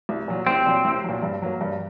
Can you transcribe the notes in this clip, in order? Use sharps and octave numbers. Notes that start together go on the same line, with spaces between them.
C2
A#2 F#3
C2 C4
A#2 F#3
C2
A#2 F#3
G2
F#3 A#3
G2